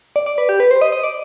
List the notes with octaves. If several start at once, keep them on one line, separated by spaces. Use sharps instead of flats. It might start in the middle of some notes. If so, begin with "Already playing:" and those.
D5
D5
B4
G4
B4
C5
D#5
D#5
D5